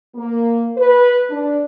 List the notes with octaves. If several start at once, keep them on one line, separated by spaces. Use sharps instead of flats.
A#3
B4
D4